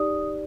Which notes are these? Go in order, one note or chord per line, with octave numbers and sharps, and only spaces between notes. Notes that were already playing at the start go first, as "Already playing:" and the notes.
Already playing: D#4 G4 D5 D#6